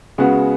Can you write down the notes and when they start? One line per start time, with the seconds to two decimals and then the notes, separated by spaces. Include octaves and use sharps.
0.18 C#3 G#3 B3 F#4